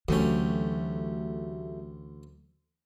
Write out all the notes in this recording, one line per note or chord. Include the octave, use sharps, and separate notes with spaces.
D2 E3 F#3 A3 C#4 G4